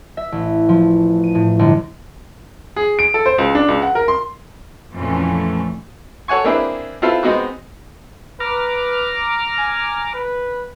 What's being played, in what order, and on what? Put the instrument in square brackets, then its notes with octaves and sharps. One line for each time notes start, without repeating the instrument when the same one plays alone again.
[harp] E5
A1
F3
D#7
A2
G1
[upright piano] G#4
D7
A4
C5
C#2
D4
C#2
F#5
A#4
C6
[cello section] F2 A#2 E3 A3 C#4
[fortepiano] A4 C#5 F#5 G#5 C#6
A#3 C4 D4 E4 G#4 B4
C4 E4 F4 A4 B4
G#3 B3 C4 D#4 F#4
[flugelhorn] B4 [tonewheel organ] A#5 D6 F6
[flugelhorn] G#5
B4